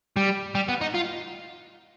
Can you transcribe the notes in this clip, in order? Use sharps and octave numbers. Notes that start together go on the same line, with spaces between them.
G3
G3
B3
D#4
F4